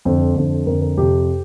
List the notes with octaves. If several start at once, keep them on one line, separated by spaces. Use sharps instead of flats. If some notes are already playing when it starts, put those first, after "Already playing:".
F2 D3 C5
F2 D3
F2 D3 A#4
A#4
F2 C3 G4